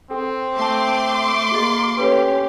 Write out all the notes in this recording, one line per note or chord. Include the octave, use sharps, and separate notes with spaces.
C4 A4 G5
A3 F5 A5 C6 D6
A#3 F#4 G#4 D#5
C#4 G4 A4 B4